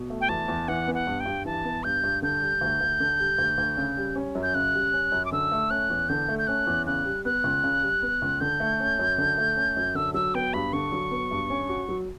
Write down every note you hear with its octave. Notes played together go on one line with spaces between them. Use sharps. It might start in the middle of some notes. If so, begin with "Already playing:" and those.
Already playing: B2
A3
G5
E2 A5
E2
E3 F#5
B3
F#5
G2
G5
G2
E3 A5
B3
G2 G6
G2
D3 G6
G3
D2
D2
D3
G3
D2
D2
C#3
G3
C#4
F#2
G6
C#3 F#6
G3
C#4
F#2
D6
D3 E6
A3
C#4 F#6
E2
D3 G6
A3
G6
C#4 F#6
E2
C#3 F#6
G3
B3 F#6
C#2
C#3
G3
B3
C#2
D3 G6
A3
C#4
F#2
D3
A3
C#4
F#2
D3 E6
F#3 E6
B3 G5
G2 B5
D3 C#6
F#3
B3
G2
C#4
F#4
F#3